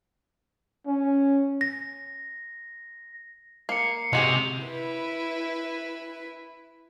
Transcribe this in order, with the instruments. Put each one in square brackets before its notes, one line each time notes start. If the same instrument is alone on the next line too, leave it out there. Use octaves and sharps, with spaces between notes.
[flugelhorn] C#4
[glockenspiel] A#6
[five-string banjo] A#3 [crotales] C7 C#7
[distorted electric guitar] C3 [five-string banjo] G#3 F#4 G#4 [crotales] F7
[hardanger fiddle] E4 B4